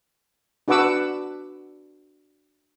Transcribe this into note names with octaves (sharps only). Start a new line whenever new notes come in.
D4 F#4 B4 F#5 D6 E6